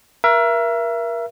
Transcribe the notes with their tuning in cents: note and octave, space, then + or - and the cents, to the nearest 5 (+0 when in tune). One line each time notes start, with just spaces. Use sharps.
A#4 +30 E5 +30